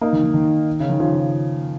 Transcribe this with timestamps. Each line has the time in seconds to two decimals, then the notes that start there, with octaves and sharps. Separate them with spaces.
0.01 A#3 D#4
0.13 D#3
0.23 D#3
0.34 D#3
0.80 C#3
0.90 D#3
1.00 C#3 F3